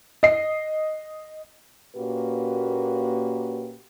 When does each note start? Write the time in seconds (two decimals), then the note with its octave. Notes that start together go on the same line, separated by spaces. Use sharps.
0.23 D#5 C7
1.95 A#2 A#3 C#4 F#4 G4 B4